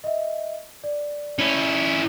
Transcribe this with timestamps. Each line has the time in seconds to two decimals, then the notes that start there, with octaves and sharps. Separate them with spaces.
0.04 D#5 E5
0.84 D5
1.39 C#4 E4